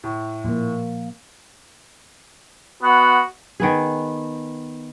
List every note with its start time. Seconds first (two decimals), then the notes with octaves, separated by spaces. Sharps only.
0.03 A2
0.45 A#2 F3 A#3
2.83 B3 F#4
3.60 D#3 B3 G#4